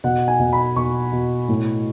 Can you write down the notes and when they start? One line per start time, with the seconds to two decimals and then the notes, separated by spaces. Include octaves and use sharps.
0.04 B2 F#5
0.28 G#5
0.39 B2
0.53 B5
0.76 B2 C#6
1.13 B2
1.49 A2